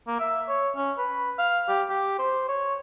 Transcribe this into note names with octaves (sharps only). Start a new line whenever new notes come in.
A#3
E5
C#5
C#4
B4
F5
G4
G4
C5
C#5